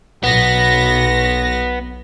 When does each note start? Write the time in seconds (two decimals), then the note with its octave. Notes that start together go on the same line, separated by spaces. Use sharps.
0.24 B1 B3 A#6